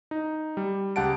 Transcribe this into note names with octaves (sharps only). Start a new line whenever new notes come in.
D#4
G3
C#2 G4 F#5 A5 D7